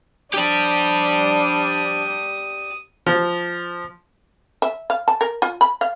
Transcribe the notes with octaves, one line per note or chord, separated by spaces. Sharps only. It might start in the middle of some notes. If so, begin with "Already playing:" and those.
F3 D4 G4 D5 D#6
F3
E5
F5
A5
A#4
F4
B5
F5